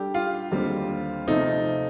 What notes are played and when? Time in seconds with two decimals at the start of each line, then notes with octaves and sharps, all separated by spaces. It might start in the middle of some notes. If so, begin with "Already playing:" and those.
Already playing: G3 D4 G4 A4 D5
0.14 F4
0.51 D#2 D3 G3 C4
1.27 C3 F3 A3 D#4